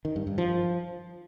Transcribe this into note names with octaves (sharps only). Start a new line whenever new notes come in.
D#3
G2
G2
F3